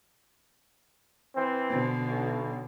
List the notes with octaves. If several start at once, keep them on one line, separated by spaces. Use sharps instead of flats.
E3 C4
B2 D3
B1